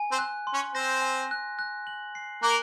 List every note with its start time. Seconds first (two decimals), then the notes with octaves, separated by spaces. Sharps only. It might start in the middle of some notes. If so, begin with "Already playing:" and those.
Already playing: G#5
0.11 C4 C5
0.19 F#6
0.47 C6
0.54 C#4 C#5
0.74 C4 C5 A#6
1.02 G#5
1.31 F#6
1.59 F#6
1.87 F#7
2.15 C7
2.43 A#3 A#4 F#6